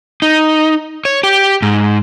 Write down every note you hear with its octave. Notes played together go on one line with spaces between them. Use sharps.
D#4
C#5
G4
G#2